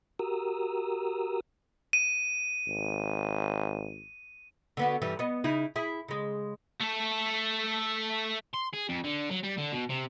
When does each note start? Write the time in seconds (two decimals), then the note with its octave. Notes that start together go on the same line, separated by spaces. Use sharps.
0.19 F#4 G4 A#4 A#5 D#6 E6
1.93 D#7
2.67 G#1
4.77 D3 B3 F#4
5.02 G2 E3 G3
5.19 B3 D#5
5.44 C#3 D#4 E4
5.76 E4 G#4
6.08 C#3 G#3
6.81 A3 A4
8.53 C6
8.73 G#4
8.89 F2
9.04 D3
9.31 F#3
9.43 G3
9.58 D3
9.72 B2
9.89 C3